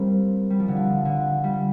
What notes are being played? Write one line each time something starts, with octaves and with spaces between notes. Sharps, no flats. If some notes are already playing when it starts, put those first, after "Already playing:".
Already playing: G3 A#3 C4
G3
F3
D3
F3
D3
G3